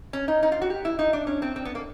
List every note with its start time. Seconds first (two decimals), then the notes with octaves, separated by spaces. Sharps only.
0.13 C#4
0.28 D#4
0.43 D#4
0.52 F4
0.62 F#4
0.70 G4
0.85 E4
0.99 D#4
1.13 D4
1.27 C#4
1.42 C4
1.56 C4
1.65 B3
1.75 A#3